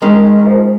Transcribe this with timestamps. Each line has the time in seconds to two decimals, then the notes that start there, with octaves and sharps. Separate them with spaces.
0.02 D#3 G#3 C#4
0.24 D#3
0.37 D#3
0.47 F3